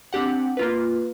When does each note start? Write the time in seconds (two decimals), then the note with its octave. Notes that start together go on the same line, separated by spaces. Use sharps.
0.13 C4 D4 G4 F#5
0.57 A#3 F4 B4